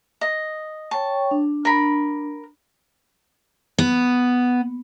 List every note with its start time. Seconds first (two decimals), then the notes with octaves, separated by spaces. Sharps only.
0.21 D#5
0.91 C#5 G5 A5 C#6
1.31 D4
1.65 A#4 B5
3.78 B3